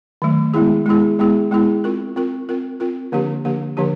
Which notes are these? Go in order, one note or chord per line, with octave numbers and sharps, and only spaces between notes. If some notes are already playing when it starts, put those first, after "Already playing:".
D#3 F#3 A3
G#3 B3 E4 G#4
G#3 B3 E4 G#4
G#3 B3 E4 G#4
G#3 B3 E4 G#4
C4 F4 A#4
C4 F4 A#4
C4 F4 A#4
C4 F4 A#4
D3 F3 A#3 D4 G4
D3 F3 A#3 D4 G4
D3 F3 A#3 D4 G4